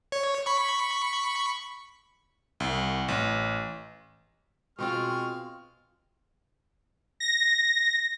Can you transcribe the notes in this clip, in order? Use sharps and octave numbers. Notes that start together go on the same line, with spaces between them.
C#5
B5 C#6
C2
A1
B2 G#3 C4 F4 C#6 F6
A#6